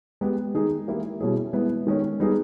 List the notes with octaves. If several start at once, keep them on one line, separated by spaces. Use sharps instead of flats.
G#3 B3 G4
D#3 G#3 D#4 G#4
E3 A#3 E4 G4
B2 G3 C#4 E4 G#4
G#3 B3 E4
D#3 G#3 C#4
G3 B3 D#4 G#4